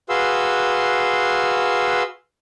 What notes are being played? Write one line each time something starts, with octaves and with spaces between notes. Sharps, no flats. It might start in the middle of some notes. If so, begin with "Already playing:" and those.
F#4 G#4 B4 F5 C6 E6